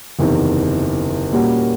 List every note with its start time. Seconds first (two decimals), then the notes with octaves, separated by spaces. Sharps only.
0.19 F#1 E2 C3 D#3
1.33 A#2 G3 A#3 C#4 F#4